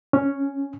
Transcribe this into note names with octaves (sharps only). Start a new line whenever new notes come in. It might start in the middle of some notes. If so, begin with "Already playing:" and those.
C#4